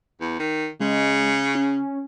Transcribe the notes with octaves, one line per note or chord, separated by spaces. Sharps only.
E2
D#3
C#3 G#3
C#4